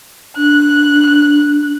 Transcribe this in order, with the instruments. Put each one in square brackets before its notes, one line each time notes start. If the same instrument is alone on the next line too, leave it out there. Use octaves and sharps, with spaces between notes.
[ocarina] D4 [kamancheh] F#6